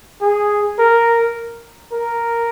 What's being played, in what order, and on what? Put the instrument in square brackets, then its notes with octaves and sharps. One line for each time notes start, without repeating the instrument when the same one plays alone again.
[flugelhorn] G#4
A#4
A#4